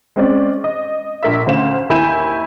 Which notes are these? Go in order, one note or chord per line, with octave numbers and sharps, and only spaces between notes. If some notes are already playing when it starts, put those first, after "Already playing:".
G#3 C4 C#4 D5
D#5
A#1 A#4 E5
D2 C#4 C5 F5 E7
D#2 E4 G#5 G6 E7